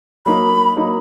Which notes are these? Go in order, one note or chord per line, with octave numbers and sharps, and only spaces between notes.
F#3 A#3 D#4 B5
F#3 A#3 D#4